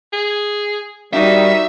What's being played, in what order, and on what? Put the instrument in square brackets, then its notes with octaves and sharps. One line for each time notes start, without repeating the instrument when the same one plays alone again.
[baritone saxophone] G#4
[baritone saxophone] D#3 [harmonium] G3 [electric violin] D#4 F#4 [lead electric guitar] E5